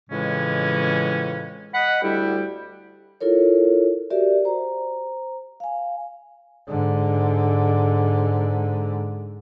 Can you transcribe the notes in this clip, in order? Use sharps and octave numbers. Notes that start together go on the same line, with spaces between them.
F2 A2 C#3 E3 G#3 C#4
D#5 F#5 B5
D2 G3 E4 G4 G5
E4 F4 A4 A#4 C#5
F#4 G4 A#4 D5 E5
C5 A#5
F5 G#5
G#2 D3